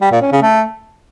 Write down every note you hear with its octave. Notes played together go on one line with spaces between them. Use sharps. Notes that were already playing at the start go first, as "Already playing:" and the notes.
G3
A#2
C#4
C#3
A3